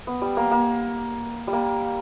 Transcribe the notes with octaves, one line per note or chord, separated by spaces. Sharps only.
B3
G3
A#3
A#3
G3
A#3